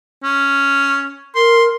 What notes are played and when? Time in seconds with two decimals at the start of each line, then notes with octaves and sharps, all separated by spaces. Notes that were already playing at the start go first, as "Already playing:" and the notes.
0.23 C#4
1.35 A#4 C6